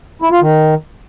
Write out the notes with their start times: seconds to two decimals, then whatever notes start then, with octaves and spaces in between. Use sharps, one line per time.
0.22 E4
0.31 F4
0.41 D#3